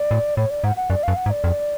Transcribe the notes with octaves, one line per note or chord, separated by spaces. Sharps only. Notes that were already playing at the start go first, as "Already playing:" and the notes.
Already playing: D5
A2
A2 C#5
D5
G#2 F#5
F#5
F#2 D5
F#2 F5
F#5
G#2
D5
F2